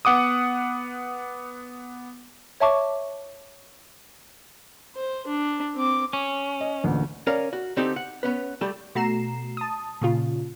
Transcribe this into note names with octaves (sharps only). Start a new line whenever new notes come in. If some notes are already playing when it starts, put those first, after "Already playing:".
B3 F#5 D6 D#6
C#5 E5 A5 C#6 D6
C5
D4
C4 D6
C#4
D#5
A1 D2 A#2
C#4 A#4 D5 F5
F#4
D3 C4 D#4 G4 A4
F#5
B3 C#4 B4
G3 A3 G4 A4
B2 A3 F#4 A#5 C7 E7
A5 D#6
A#2 C#3 F4